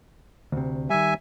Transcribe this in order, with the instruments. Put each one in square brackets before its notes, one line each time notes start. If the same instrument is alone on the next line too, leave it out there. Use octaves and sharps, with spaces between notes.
[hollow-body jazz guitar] D2 C3
[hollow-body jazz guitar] D#3 G3 [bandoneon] E5 G#5